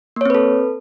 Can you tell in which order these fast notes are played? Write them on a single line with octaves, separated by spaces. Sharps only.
A#3 C#5 C4 B4 A4